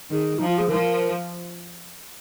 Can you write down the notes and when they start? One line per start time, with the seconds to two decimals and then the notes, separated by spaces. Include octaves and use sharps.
0.11 D#3 G#4
0.39 F3 D#4
0.48 F4
0.58 G#4
0.69 F3 A#4